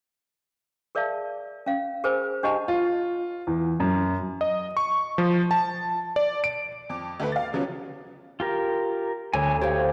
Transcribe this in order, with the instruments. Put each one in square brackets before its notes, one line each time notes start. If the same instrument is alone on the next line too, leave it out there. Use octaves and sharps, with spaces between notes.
[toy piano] G#4 A#4 D5 E5 F5 A5
C#4 F5
G#4 A#4 C5 G#5 B5
D4 G4 D#5 F#5 A5 B5
[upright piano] F4
E2
F#2
[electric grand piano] D#5
C#6
F3
A5
D5
D7
[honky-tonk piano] F2 D6
D2 A3 B4
F5 A6
C#3 F3 F#3 B3 C#4
[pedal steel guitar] F4 G4 A#4
[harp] D2 [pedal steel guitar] D3 C#5 G#5
[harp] G4 [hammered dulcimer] C5 F5 [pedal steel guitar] C#5